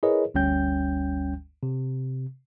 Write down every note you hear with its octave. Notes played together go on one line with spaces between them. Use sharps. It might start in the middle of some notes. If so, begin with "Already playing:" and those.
E4 G#4 A#4 B4 C#5 D#5
G1 D2 G3 C#4 G5 G6
C3